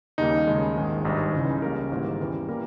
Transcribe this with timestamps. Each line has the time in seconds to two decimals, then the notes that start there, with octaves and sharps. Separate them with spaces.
0.18 D#2 C#3 G3 A#3 D#4
0.47 D#2 C#3 G#3
0.76 A#1 G#2 D#3 G#3
1.05 G#1 G2 G3 D#4
1.33 C#2 C#3 E3
1.62 C#2 C#3 G3 A#3 A#4
1.91 G#1 G#2 E3 G3 A#3
2.20 E2 C#3 E3 G3
2.49 E3 G3 A#3 A#4